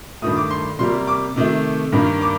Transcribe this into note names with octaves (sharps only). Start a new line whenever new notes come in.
G2 D#3 A3 D#6
D6
C6
C3 G3 A#3 C6
D6
C3 D#3 A3
G2 D#3 A#3
D6